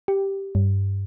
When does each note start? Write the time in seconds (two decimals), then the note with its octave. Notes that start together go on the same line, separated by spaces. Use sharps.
0.08 G4
0.55 G2